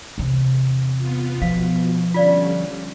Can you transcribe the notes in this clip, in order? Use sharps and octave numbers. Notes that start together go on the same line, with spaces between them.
E2 C3
B3 F4
B2 F3 F5
D3 G3 C#4 F4 D5 F5